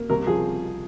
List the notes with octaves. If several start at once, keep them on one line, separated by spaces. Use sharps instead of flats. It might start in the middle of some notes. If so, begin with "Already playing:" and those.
Already playing: A#3
C2 A#4
F3 G#4